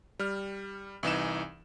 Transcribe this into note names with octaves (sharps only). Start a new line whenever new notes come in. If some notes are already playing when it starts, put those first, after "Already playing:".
G3 F6
C2 E3 D#4 E7